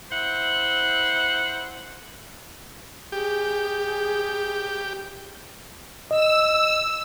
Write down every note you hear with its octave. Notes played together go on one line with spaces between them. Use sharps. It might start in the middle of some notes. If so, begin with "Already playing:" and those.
E4 C5 E5 F#5
G4 G#4
D#5 E6